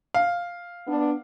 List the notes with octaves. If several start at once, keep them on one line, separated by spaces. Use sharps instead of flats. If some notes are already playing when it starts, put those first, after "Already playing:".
F5
B3 D4